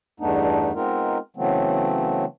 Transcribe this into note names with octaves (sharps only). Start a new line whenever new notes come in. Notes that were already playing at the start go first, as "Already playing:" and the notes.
E2 G2 A3 B3 D4 D#4
G#3 B3 C4 D#4 F4 A#4
C#3 E3 F#3 A3 B3 C4